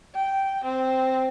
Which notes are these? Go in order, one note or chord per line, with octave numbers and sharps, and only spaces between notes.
G5
C4